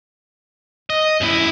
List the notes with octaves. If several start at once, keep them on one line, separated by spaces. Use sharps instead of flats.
D#5
F#2 E4